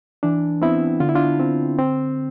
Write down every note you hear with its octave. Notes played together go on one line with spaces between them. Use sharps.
E3 D4
B3 C4 E4
D3 F4
E4
D4 F4
C4
C4